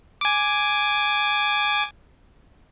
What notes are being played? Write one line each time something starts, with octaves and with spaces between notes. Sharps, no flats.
G#5 D6